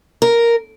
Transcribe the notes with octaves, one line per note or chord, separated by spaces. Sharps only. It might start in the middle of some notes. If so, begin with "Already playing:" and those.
A#4